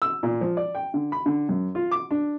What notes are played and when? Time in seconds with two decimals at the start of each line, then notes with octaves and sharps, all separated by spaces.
0.02 E6
0.23 A#2
0.41 F3
0.57 D5
0.75 G5
0.94 D3
1.12 B5
1.26 D3
1.49 F#2
1.75 F4
1.91 D6
2.11 D4